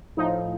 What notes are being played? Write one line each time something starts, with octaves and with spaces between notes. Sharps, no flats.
A2 F3 D#4